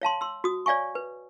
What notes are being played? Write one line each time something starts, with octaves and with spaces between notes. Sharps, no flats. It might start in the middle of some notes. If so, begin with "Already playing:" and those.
C#5 F5 A5 C6
C6 E6
F#4 D#6
C#5 D5 F5 G#5 C#6
B4